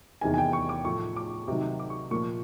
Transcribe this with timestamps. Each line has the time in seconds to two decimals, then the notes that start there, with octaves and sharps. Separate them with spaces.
0.21 E2 C3 D#3 G#5
0.34 G#5
0.38 G5
0.53 C#6
0.69 D6
0.84 A2 F3 A3 C#6
1.16 D6
1.48 C3 D#3 F#3
1.79 D6
1.90 C#6
2.11 A#2 F3 A#3 C#6